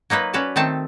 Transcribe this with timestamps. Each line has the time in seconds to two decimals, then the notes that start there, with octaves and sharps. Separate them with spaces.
0.10 F#3 A#3 D#4 B4
0.33 C#4 F#4 B4 D5 A5
0.56 D#3 A3 C4 A5